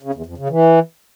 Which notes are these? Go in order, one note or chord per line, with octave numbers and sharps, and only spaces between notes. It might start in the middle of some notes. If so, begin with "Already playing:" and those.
C#3
E2
F2
C#3
E3